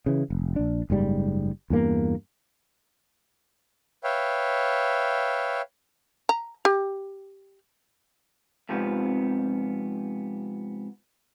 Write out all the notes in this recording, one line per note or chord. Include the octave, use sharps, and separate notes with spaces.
C#3 E3
F1
A#1 D4
F#1 G#2 G3
E2 G2 A#3
B4 C#5 E5 F5 G5
A#5
G4
F2 G#2 C3 F3 B3